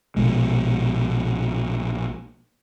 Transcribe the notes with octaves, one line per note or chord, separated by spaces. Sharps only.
A#1 B2 G#3